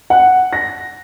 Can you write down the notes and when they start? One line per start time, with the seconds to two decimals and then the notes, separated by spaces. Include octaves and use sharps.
0.10 F#5
0.53 A#6